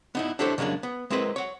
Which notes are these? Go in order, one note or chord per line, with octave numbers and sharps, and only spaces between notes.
B3 D#4 E4
D4 E4 G4 A4 C5 C#5
C#3 F#3 G#3 A#3 D4
B3
G#3 C4 E4 A#4 B4
C#5 F#5